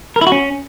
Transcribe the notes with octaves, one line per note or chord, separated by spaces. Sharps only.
A#4
E4
F#4
C#4